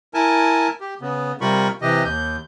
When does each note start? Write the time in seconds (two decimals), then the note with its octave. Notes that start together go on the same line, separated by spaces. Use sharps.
0.14 E4 A#4 G#5 A5
0.81 G4
1.01 C#3 B3
1.41 C3 G3 F4 A#4 B5 C#6
1.82 C3 E3 G4 D#5
2.04 D#2 G6